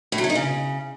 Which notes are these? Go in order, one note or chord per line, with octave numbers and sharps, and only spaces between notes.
A2
F#3
A3
D#4
C#3